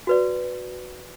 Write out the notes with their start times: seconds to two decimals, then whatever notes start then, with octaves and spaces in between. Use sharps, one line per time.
0.07 F#4 B4 D5